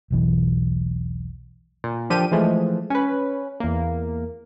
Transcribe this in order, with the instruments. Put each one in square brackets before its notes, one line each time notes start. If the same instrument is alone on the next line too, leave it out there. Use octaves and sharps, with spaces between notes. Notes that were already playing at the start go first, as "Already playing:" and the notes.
[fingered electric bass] E1 B1 E3
[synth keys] A#2
D3 F3 G4 A4 D#7
E3 F3 G#3 A3
C#4 B4
E2 A#3